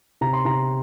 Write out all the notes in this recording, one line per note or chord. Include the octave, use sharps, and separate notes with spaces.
C3 A#5
C6
C3 A#5